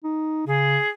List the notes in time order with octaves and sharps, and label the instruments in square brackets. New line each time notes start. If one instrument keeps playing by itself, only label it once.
[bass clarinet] D#4
[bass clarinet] C#3 [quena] G#4